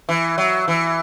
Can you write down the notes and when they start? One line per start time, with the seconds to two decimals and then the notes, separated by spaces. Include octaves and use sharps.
0.09 E3
0.38 F#3
0.68 E3